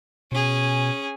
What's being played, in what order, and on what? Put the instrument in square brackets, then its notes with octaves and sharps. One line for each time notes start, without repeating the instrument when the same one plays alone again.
[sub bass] B2 [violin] C#4 G#4